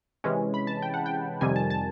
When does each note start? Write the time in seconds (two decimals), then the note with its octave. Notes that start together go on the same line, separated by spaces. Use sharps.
0.24 C3 E3 G#3 C#4
0.54 B5
0.67 A5
0.82 G5
0.94 F#5
1.06 G5
1.41 F2 C3 D#3 G3 G#5
1.56 A5
1.70 A5